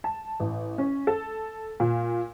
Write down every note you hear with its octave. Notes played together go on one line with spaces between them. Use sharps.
A5
A1
C#4
A4
A#2